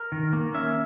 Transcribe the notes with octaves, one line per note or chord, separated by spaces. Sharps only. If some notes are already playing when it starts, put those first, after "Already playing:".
Already playing: A#4
D#3
A#3
C#4 E5